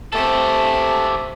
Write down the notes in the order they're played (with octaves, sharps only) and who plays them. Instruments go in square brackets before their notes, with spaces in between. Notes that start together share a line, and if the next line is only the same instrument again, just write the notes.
[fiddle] A3 C4 [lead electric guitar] G4 A4